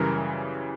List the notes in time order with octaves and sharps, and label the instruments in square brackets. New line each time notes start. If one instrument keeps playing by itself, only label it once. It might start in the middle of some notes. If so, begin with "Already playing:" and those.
Already playing: [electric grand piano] F#2 C#3 E3 G3 [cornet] A#4